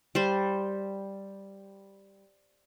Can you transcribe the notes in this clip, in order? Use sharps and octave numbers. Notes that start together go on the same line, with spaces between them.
G3 C5